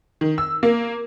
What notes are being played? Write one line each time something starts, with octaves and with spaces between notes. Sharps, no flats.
D#3
E6
A#3